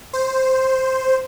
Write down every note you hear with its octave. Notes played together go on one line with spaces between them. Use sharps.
C5